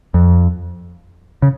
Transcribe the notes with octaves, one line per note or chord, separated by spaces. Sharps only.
F2
C#3